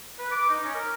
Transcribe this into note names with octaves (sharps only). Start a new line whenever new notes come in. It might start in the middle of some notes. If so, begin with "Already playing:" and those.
B4
D6
D#4
C#4
A#4